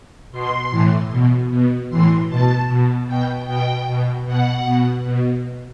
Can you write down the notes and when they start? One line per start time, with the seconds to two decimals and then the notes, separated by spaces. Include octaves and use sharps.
0.32 B2 C6
0.71 A2 E3
1.11 B2
1.50 B2
1.90 A2 E3 C6
2.29 B2 A5
2.68 B2
3.08 B2 G5
3.47 B2 G5
3.87 B2
4.26 B2 F#5
4.66 B2
5.05 B2